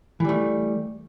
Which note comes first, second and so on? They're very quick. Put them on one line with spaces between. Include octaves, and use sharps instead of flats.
E3 G3 A3